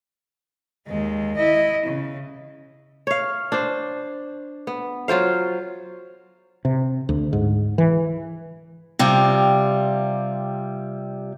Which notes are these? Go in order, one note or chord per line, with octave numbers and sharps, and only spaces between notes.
D#2 G#3
E4 D#5
C#3
C#5 F5
D4 C5
B3
F#3 F4 C5 F5
C3
D2
G#2
E3
C3 G3 F4